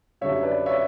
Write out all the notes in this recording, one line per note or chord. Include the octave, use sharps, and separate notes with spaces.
F#2 D3 G3 C#5 E5
B4 D5
C#5 E5